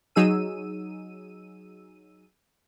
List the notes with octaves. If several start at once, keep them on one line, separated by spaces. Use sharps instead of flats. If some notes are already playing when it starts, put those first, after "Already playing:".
F#3 D#4 G#4 E6 D#7